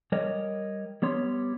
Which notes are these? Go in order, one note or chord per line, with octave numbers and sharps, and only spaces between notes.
G3 A#4 C#5 D#5
G3 B3 C#5 C6